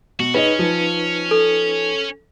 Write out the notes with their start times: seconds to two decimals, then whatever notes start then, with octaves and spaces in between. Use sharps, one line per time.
0.20 B2 F#4
0.35 C#4 D#4 G#4 B4 C#5 D#5
0.59 F3
1.31 A4